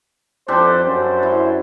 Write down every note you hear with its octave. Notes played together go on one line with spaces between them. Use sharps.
F2 D4 G4 A4 C5
F#2 C5
E4